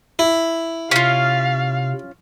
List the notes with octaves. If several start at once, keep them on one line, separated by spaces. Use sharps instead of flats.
E4
C3 C#4 F4 F5